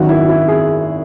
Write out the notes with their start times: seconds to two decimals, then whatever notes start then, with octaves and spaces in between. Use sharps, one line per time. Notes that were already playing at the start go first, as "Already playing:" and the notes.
Already playing: G#1 F#2 D#3 F#4
0.09 E4
0.29 E4
0.48 G#4